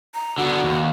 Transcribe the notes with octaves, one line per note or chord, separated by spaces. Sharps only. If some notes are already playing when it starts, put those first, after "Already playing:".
A#5
D3 B3 F#4
D#2